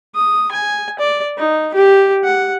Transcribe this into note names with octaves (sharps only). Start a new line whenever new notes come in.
D#6
G#5
D5
D#4
G4
F#5